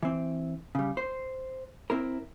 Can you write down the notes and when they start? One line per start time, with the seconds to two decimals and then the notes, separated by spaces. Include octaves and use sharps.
0.03 E3 C4
0.75 C#3 G3
0.97 C5
1.90 C4 E4 A#4